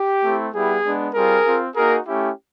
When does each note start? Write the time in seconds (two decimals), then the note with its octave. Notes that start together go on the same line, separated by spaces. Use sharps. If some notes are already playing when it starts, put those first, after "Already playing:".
Already playing: G4
0.23 A3 C4 E4
0.52 G3 B3 E4 G4 G#4
0.84 G#3 B3 D4
1.14 G3 C4 F4 G#4 A#4
1.44 C4 F4
1.74 A#3 D#4 F#4 G#4 A#4
2.05 A3 C#4 E4 G4